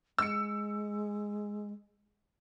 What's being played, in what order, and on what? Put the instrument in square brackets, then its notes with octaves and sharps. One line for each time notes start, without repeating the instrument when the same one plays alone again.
[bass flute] G#3 [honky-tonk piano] E6 C#7